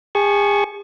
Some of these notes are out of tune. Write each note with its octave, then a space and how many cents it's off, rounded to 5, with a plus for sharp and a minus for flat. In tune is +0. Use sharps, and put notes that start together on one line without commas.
G#4 -40 G#5 +45 C#6 +0